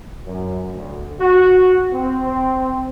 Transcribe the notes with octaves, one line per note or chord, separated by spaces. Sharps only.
F#2
D2
F#4
C4